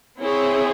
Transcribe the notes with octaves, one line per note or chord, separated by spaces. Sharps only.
C4 E4 G#4 C#5